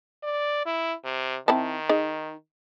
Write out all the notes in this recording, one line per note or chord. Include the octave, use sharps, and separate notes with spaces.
D5
E4
C3
D#3 C4 E4 A5
D#4 G#4